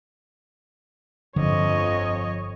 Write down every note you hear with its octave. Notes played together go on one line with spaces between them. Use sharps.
G1 F2 D3 F3 C#5 D#5